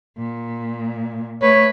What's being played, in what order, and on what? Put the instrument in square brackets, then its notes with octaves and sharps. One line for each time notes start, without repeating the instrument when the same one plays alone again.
[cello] A#2
[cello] A3 B4 [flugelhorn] C#5